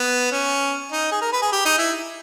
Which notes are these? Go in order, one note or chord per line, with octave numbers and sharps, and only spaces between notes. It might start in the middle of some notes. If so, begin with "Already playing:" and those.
Already playing: B3
C#4
D#4
G#4
A#4
B4
G#4
G4
D#4
E4